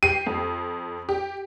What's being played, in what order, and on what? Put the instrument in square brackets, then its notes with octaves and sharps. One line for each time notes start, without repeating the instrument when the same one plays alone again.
[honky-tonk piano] G4 C7 [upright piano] D#7
[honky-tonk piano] F2
G4